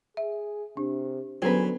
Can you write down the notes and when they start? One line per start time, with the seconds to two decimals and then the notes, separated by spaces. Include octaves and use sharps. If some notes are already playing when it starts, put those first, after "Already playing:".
0.17 G#4 E5
0.77 C3 D4
1.42 D3 F#3 B3 C#4 G#4 B4 C5